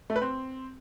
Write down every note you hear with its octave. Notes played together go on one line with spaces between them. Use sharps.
A3
B4
C4